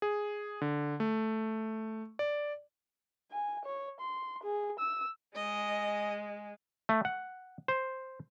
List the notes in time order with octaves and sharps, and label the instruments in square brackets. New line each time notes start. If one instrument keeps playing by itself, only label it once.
[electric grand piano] G#4
D3
A3
D5
[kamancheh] G#5
C#5
C6
G#4
E6
[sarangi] G#3 [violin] D#5
[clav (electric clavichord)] A3
F#5
C5